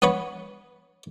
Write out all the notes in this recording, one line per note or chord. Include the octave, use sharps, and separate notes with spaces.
B3 B4 C#5 B5